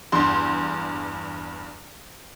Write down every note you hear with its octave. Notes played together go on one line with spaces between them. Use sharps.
E2 G2 C6